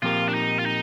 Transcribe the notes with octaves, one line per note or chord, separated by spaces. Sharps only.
A#2 F3 C4 F4 G4 A#4
D4
D#4
F4
D#4